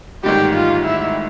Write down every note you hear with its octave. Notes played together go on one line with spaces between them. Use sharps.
A1 G#2 D#3 G3 G4
F4
E4